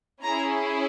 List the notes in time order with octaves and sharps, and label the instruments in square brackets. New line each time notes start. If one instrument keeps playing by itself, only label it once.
[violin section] C#4 E4 G#4 A#5